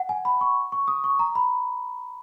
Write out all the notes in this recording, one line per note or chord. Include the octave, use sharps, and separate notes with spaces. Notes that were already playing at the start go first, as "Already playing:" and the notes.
Already playing: F#5
G#5
B5
C#6
C#6
D#6
C#6
A#5
B5